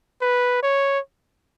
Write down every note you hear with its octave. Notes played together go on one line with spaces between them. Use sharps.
B4
C#5